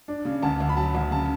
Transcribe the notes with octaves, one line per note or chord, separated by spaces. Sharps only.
D4
C#3
D2 A5
D2
B5
F#3 A5
D2
C#3 A5